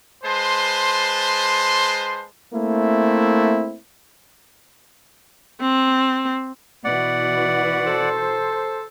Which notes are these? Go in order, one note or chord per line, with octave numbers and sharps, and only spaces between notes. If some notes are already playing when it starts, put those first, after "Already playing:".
G#3 B4 C5 A5 C6
A3 A#3 C4 E4
C4
B2 E3 F#4 D5 F#5
A4 C5